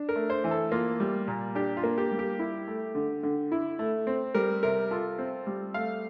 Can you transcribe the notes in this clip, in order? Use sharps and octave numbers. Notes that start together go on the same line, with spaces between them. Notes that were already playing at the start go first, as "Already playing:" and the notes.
Already playing: D4
A#4
A3
C5
E3
A4
A#3 F4
G3
A#2
D4 G4
F4
A#3
G4
G3
G4
E4
A3
D3
D3
E4
A3
C4
G3 A#4
C3 A#4
F4 A4
C4
G3
A3 F5